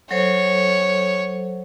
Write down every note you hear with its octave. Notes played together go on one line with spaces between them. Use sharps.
F#3 A4 C5 C#5